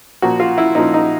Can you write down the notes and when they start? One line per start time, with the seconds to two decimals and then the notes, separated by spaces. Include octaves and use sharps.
0.22 A#2 F3 F#4
0.40 F4
0.58 E4
0.75 A#2 F3 D#4
0.94 D#4